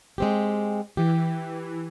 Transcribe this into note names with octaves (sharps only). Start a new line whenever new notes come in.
G#3 C4 G4
E3 G4